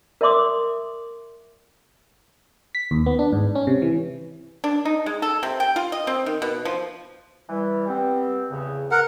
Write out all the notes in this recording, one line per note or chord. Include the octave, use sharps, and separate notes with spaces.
A#4 D5 E5 C6 D6 D#6
B6
D#2
B3
D4
G#2
C#4
C3
E3
D4
D#4
G#3
A4
C3
G5
F4
D#5
C4
D#3
B2
F3
E3 G3
G3 B3 C4
E2 A2 C#3
A#4 F#5